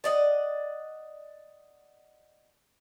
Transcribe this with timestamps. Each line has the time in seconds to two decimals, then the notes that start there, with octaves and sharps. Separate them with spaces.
0.04 D5 D#5 F#5